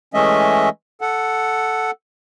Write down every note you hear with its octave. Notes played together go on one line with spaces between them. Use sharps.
E3 G#3 A3 C#4 D#5 E5
A4 F#5